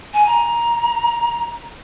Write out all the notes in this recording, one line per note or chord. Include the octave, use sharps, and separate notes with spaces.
G#5
A#5